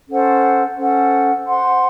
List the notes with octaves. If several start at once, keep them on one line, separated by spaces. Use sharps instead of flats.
C#4 A4 C5 F#5
C#4 A4 C5 F#5
C5 F#5 C6